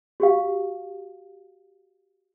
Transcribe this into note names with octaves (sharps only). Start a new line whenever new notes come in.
F#4 G4 F5